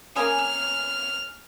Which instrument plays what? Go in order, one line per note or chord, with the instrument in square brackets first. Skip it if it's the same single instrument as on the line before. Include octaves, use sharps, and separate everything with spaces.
[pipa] A#3 C#4 G#4 [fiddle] F6